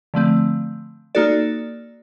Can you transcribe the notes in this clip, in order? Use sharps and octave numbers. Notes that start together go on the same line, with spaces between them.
D3 F3 A3 C4
A#3 D#4 F#4 A4 D5